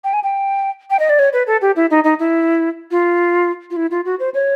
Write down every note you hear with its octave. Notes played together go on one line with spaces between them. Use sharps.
G5
G#5
G5
G5
D#5
D5
C#5
B4
A4
G4
E4
D#4
D#4
E4
F4
F4
E4
F4
F#4
C5
C#5